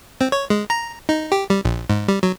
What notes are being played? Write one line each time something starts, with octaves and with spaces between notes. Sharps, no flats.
C4
C#5
G#3
A#5
D#4
G4
G3
A#1
G#2
G3
F#3